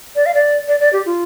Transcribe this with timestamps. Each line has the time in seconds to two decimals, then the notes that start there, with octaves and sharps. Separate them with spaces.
0.16 D5
0.26 F5
0.34 D5
0.68 D5
0.80 D5
0.93 G4
1.06 F4